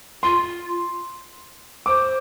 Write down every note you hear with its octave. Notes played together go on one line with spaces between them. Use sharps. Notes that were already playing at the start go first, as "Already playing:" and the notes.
F4 C6
C5 D6